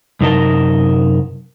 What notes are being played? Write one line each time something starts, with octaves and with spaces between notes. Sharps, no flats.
F#2 C3 D#4 A#4 D#5 A5